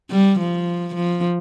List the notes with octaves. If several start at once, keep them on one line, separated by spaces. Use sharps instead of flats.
G3
F3
F3